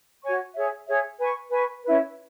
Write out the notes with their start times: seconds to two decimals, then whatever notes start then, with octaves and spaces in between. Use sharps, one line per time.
0.23 F#4 C#5 G#5 C#6
0.54 G#4 C#5 E5
0.87 G#4 C#5 E5
1.19 B4 G#5 C#6
1.51 B4 G#5 C#6
1.83 C#4 E4 B4